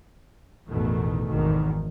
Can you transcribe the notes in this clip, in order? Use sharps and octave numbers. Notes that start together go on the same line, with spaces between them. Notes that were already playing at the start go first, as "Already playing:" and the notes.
A1 E2 B2 D#3 A3
G#1 E2 D#3